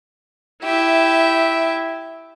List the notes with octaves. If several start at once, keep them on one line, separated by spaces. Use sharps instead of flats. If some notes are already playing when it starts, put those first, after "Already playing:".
E4 G4 E5